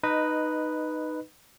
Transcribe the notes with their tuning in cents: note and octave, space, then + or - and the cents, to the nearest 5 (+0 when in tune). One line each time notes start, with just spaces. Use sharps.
D#4 -15 B4 +0 D#5 +0